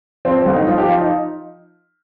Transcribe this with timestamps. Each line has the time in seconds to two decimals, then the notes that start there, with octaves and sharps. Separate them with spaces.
0.25 F3 C4
0.39 C4
0.45 G1
0.53 D#4
0.67 F3 F4
0.78 G4
0.88 F3 F4
0.98 D#4